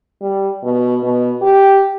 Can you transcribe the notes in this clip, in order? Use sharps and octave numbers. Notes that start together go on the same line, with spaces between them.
G3
B2
B2
G4